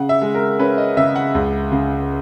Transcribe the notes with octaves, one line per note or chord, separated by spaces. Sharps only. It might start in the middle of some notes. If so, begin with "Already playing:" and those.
Already playing: C#3 F#5
E5
G#3
A#4
C#4 B4
D#5
C#3 E5
F#5
C#2
C#3